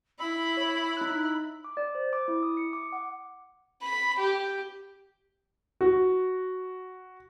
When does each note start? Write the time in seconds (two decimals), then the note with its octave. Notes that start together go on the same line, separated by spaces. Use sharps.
0.19 E4 B5 E6
0.57 C#5
0.97 D#4 F#6
1.64 D6
1.77 D5
1.95 C5
2.13 D6
2.28 E4
2.43 D#6
2.57 C#7
2.73 D6
2.92 F#5
3.82 B5
4.19 G4
5.81 F#4